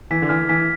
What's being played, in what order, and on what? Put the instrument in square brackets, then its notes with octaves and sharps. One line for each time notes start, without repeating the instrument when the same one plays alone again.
[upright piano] E3 [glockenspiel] B6
[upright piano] D3
[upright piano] E3 [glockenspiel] F6
[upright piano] E3 [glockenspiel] B6